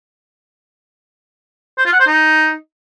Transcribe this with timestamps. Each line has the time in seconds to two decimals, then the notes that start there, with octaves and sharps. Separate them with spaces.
1.78 C5
1.85 F4
1.93 F#5
2.00 C5
2.07 D#4